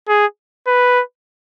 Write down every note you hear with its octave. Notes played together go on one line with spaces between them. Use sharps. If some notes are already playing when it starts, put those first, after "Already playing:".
G#4
B4